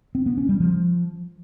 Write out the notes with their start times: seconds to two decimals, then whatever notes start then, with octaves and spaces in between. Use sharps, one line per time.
0.15 C4
0.26 B3
0.38 C#4
0.49 G3
0.60 F3